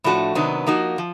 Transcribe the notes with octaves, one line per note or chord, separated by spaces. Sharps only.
A2 F3 A3 D4 F#4
C3 D#3 F#3 B3 D4
F3 A#3 D#4 F#4
F3